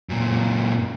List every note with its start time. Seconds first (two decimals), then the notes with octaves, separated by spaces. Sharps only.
0.09 F#2 A#2